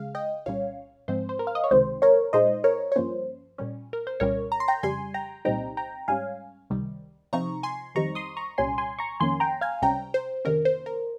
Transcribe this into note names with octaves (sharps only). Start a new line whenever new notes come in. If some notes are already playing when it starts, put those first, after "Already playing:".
Already playing: C#3 G#3 F5
D#5 G5
C2 A#2 G3 C#4 C#5 F5
G#2 F3 G#3 C4 C5
C5
A#4
F5
D#5
C#5
C#2 C3 D#3 G#3 C4 C5
A#4 C#5
A#2 G#3 D#4 C5 D#5
A#4 C#5
C#5
G2 F3 A#3 C#4 C5
A#2 G3 C#4
A#4
C5
C2 A#2 G3 C#4 A#4 C#5
A#5
C6
G5 A#5
F2 C#3 G3 G#5 C6
G5 A#5
C2 A#2 G3 C4 D#4 G5 A#5
G5 A#5
G#2 G3 C#4 F5 G#5
C#2 C3 D#3 G3
C3 F3 C4 D#4 A#5 C#6
G#5 C6
F2 D#3 G3 C4 D#4 A#5 C#6
C6 D#6
A#5 C#6
C2 A#2 G3 C#4 G#5 C6
G#5 C6
A#5 C#6
F2 D#3 A#3 C#4 G#5 C6
G5 A#5
F5 G#5
C#2 C3 G3 C#4 G5 A#5
C5
F2 C3 D#3 A#3 C#4 A#4
C5
A#4